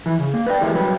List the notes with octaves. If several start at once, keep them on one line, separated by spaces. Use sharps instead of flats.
E3
C#3
A#3
B4 D5 G5
D#3 E3 G#3 A#3 E4 G4
F#3 G3 B4